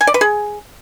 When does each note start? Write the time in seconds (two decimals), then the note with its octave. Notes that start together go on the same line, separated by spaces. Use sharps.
0.01 G#5
0.07 D5
0.14 B4
0.21 G#4